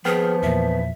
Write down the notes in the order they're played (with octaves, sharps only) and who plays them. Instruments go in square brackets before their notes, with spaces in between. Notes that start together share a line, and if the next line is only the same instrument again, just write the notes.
[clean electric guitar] D#2 B3 [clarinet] F3 [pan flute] G#4 [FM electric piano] G5 F6
[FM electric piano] E2 A#2 [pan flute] E5